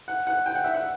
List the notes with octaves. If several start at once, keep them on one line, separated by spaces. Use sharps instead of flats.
F#5
F#5
G5
F#5
E5
F#5